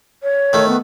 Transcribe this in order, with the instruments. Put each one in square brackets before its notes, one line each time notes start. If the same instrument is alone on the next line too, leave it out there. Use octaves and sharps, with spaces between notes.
[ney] C#5
[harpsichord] D#3 A3
[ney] B3